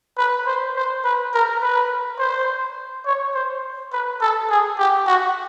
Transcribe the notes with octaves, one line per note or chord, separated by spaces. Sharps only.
B4
C5
C5
B4
A#4
B4
C5
C#5
C5
B4
A4
G#4
G4
F#4